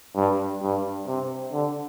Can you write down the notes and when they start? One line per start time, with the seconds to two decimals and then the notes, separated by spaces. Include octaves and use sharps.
0.15 G2
0.62 G2
1.07 C3
1.53 D3